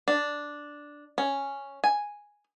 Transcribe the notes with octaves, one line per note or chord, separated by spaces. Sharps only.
D4
C#4
G#5